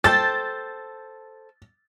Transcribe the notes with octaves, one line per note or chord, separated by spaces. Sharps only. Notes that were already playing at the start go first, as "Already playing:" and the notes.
A4 C5 G5 A6